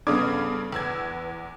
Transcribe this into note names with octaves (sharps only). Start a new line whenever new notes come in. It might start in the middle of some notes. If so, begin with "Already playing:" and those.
G2 C#3 B3 D4 A4 D6 D#6 G#6
E2 B4 E6 G#6